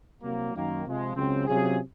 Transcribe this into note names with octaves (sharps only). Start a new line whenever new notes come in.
C2 C3 F#3 A#3
F#2 D#3 A#3
C3 F3 G#3
C#2 C#3 F#3 C4
C3 F#3 C#4 F4 G#4